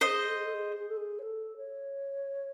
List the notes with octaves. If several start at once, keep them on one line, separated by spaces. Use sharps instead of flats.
G#4 A#4 C5 D#5
A4
G#4
A4
G#4
G#4
A4
G#4
C#5
A4
C#5